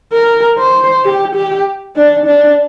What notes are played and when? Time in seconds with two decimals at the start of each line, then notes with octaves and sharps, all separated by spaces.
0.13 A#4
0.58 C5
1.04 G4
1.35 G4
1.96 D4
2.26 D4